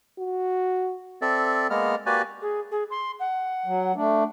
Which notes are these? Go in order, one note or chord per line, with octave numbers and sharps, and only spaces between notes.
F#4
C4 A4 D5 E5
G#3 A#3 B3 F6
A#3 F#4 G4 B4 D5 G#5
G#4
G#4
C6
F#5
F#3
A3 D4